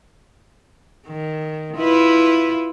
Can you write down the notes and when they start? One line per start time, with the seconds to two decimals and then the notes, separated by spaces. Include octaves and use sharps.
1.07 D#3
1.76 E4 F4 B4